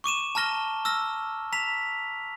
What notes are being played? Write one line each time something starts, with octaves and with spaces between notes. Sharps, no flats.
C#6 D6 D#7 E7
A5 A#5 F6 A#6 G7
E6 F6 A#6
A#5 B6 F7